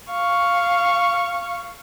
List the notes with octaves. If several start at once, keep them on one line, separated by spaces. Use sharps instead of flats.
F5 C#6